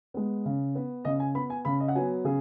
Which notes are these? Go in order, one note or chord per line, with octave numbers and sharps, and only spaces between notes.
G#3 B3
C#3
B3
C#3 D#5
G#5
B3 B5
G#5
C#3 B5
D#5
F#5
F#3 B3 G#5
C#3 G#4